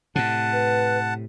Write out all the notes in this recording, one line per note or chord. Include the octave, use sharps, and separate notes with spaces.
A2 C3 F#5 A5
B4